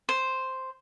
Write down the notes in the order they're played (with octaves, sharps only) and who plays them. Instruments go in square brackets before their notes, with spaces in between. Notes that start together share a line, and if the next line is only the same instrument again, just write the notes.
[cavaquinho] C5